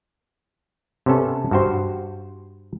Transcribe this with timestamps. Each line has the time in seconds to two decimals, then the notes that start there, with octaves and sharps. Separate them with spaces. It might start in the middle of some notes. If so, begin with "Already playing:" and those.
1.06 C3 B3 C#4 A4
1.51 G2 F#4 C5